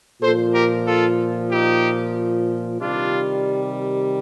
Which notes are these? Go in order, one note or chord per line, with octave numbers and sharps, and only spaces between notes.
A#2 F3 A4 C5
G4 A#4
F4 A4
D#4 G4
C3 D#3 G3 D4 F4